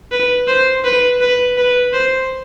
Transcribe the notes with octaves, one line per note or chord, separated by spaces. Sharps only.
B4
C5
B4
B4
B4
C5